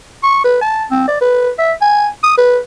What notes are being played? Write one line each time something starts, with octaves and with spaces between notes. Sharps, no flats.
C#6
B4
A5
C4
D5
B4
E5
G#5
D#6
B4